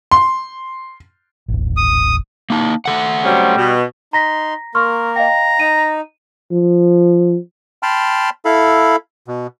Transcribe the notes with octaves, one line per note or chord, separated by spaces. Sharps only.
C6
D#1 A1
D#6
A#3 D#4 A5
A3 A4 F#5
F#3 G3 C4 C#4
B2
D#4 A#5 C6 A#6 B6
A#3 A#4 C6 C#6 F6
D#5 F5 G5 A#5
D#4 D#7
F3
G5 A5 B5 C6 F6
E4 A4 F5 B5
B2